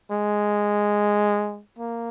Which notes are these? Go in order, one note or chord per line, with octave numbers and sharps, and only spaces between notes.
G#3
A#3